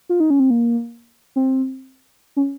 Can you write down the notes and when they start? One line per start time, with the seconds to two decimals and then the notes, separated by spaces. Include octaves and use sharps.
0.09 F4
0.20 D#4
0.30 C#4
0.40 C4
0.50 A#3
1.36 C4
2.37 C#4